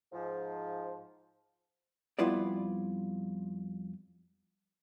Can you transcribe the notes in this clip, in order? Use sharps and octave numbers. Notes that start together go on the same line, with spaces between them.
G#2 F3
F2 G3 B3 E4 F4 D5